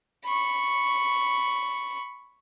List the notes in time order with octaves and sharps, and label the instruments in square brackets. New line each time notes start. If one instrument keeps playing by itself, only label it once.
[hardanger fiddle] B5 C#6